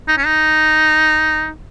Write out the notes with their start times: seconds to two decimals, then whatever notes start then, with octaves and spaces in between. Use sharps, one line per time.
0.08 D#4
0.18 C#4
0.26 D#4